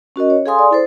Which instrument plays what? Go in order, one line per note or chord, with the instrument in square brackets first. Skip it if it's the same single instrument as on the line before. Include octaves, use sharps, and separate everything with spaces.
[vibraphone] C#4 F#4 A#4 D#5
C#5
G#4 A4 F5 G#5 C6 D#6
D5
E4 A4 C5